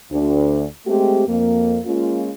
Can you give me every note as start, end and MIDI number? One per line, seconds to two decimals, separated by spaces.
0.11 0.64 38
0.11 0.64 62
0.87 1.27 56
0.87 1.27 57
0.87 1.27 60
0.87 1.27 67
1.27 1.78 41
1.27 1.78 58
1.85 2.30 56
1.85 2.30 58
1.85 2.30 61
1.85 2.30 65